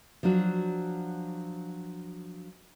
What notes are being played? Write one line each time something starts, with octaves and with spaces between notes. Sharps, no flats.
F3 F#3 D4 F#4